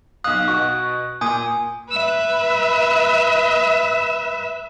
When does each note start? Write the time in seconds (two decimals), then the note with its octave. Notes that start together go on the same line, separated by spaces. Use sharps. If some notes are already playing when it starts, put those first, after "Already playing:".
0.24 B1 F5 D#6 F#6
0.48 B2 F#4 C#6
1.21 A#2 G#5 D#6 G6
1.90 B4 E5